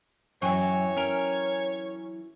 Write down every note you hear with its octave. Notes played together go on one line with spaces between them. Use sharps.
F#2 E3 F#3 C#5 G5 G#5 C#6
C#4 A#4